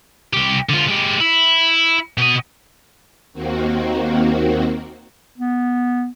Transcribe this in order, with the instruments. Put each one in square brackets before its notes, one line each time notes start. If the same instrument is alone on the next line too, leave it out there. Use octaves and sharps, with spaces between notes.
[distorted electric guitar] C2 G4
D3 F4
G#3 G4
E4
B2 D#5
[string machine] D#2 D#3 A#3 C4 F#4
[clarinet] B3